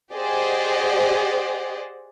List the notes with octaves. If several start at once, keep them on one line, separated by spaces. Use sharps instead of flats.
G4 G#4 C5 D5 D#5 F#5